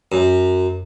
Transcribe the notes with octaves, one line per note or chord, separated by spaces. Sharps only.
F#2